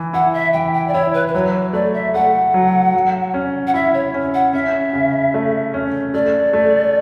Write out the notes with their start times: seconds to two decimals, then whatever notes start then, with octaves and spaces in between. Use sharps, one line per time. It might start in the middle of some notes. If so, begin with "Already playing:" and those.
Already playing: E3
0.13 E4 F#5
0.34 E5
0.53 E3 G5
0.74 G5
0.88 D5
0.93 E4 C#5
1.14 B4
1.28 B4
1.34 F#3 C#5
1.73 A3 D5
1.94 E5
2.14 A3 F#5
2.54 F#3
2.93 F#3
3.34 C#4
3.67 F#5
3.74 E4 E5
3.94 C#5
4.14 C#4
4.34 F#5
4.53 C#4 E5
4.93 C#3
5.34 A3
5.74 C#4
6.14 A3 D5
6.53 A3